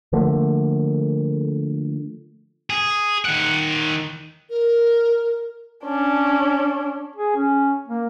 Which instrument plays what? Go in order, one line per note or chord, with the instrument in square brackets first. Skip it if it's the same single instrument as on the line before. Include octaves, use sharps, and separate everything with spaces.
[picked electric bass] D3 F3 A3 A#3
[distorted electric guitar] G#4
D#3 F#5
[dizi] A#4
[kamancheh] C#4 D4
[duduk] G#4
C#4
A#3